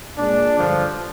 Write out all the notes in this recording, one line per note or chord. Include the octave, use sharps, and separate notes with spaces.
A#2 G#3 D4
G2 D3 F3